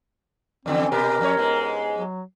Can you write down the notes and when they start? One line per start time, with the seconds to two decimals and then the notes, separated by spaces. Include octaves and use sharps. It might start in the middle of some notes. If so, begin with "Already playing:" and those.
0.66 F2 D3 E3 C4
0.91 B2 B3 G4 A#4
1.21 F2 C#5
1.37 G#2 G#3 B3
1.96 F#3